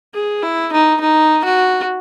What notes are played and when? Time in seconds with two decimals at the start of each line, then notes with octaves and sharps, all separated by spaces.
0.14 G#4
0.43 E4
0.72 D#4
1.01 D#4
1.44 F#4